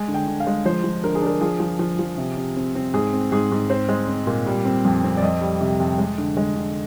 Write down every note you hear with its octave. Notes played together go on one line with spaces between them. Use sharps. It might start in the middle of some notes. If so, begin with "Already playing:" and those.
Already playing: G#3 G#5
D3
G5
D3
F5
G#3
F3 C5
F3
D3 A#4
G#4
D4 A#4
F3 G#4
F3
F3
F3
C3
C3
C4
C4
G#2 G#4
C4
G#2 G#4
G#2
C4 C5
G#3
C4
A#2
G3
C4
F2
C4
D5
F2 D#5
G3
C3
F2
G#3
D3
G#3
D3